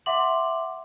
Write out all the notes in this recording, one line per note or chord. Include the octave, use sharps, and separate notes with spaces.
E5 F#5 C6 D6 F#7